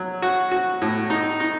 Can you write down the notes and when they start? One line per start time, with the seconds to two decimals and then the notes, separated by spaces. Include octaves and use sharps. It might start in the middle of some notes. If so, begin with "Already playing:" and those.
Already playing: F#3
0.22 F#4
0.52 F#4
0.82 A2
1.10 D#4
1.40 D#4